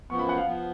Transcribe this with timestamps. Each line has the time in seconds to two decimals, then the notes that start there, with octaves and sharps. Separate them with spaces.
0.10 F#2 F3 B3 C#6
0.19 B5
0.29 F#5
0.37 F5
0.46 F3 B3